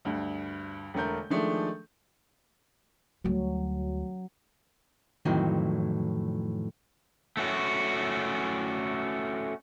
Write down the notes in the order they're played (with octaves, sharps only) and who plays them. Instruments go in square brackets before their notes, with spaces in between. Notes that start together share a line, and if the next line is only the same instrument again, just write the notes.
[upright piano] D2 G2
E1 D3 A3 A#4 G6
D#3 F3 G#3 A3 D4
[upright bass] D2 G3 [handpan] F#3
[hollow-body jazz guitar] F2 A2 D#3 E3 F#3
[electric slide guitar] A3 C#4 F#4